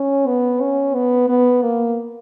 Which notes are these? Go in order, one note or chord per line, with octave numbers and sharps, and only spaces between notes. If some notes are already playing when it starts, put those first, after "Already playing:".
Already playing: C#4
B3
C#4
B3
B3
A#3